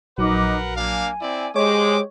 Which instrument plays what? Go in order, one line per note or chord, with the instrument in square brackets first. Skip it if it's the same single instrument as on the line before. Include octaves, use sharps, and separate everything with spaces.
[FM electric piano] A#1 F#3 [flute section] D#4 D6 [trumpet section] A#4 B4 F#5
[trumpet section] A#3 D4 F5 [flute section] G#5
[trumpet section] C4 E4 D5
[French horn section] G#3 [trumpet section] G4 C5 D6 [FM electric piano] C#5